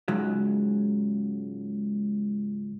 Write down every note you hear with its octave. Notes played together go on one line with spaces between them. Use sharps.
C#2 G#2 F#3